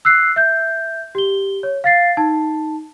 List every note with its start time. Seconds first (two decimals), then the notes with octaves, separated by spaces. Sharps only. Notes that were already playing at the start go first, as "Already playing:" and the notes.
0.05 E6 F#6 C7
0.36 E5 G6
1.15 G4 G7
1.63 C#5
1.84 F5 A6 C7
2.17 D#4 A5